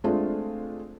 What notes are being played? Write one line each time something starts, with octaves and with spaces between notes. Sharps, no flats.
G#3 A3 C4 D4 F4